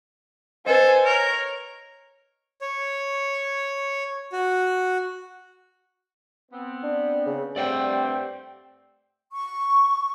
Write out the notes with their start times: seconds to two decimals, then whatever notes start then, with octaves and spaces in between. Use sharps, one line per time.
0.66 A4 B4 C5 D#5 G#5
1.05 A#4 C#5
2.60 C#5
4.32 F#4
6.52 B3 C4
6.84 D4
7.26 C#3
7.56 G2 A3 C4 G4 D5 F#5 G5
9.32 C#6